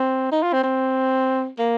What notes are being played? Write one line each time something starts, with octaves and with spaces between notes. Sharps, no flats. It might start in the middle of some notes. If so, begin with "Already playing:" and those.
Already playing: C4
D#4
F4
C4
C4
A#3